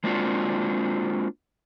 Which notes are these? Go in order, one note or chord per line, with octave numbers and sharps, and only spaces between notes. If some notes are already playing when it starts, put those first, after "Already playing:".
G#3 A#3 C4 D4 F4 F#4